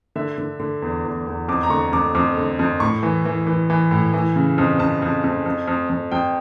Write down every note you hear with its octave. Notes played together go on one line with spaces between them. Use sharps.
D3 E5
D3
D3
E2
E2
E2
F2 D6
A#5
D3 C#6
F2 D6
F2 D6
D3
F2
A2 C#6
E3
E3
E3
E3
A2
E3
C#3
F2
F2 A5
F2
F2
F2
F2
F2
F2 G5